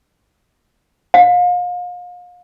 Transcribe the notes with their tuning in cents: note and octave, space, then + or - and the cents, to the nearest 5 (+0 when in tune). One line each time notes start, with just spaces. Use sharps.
F5 +35